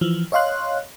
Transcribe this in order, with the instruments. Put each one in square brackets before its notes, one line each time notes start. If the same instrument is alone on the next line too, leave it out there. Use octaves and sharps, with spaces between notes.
[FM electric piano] E3 F3
C#5 D#5 F5 C6 F#6